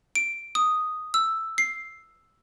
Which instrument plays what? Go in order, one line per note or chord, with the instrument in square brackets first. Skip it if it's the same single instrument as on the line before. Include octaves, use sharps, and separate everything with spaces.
[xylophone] D7
D#6
E6
C7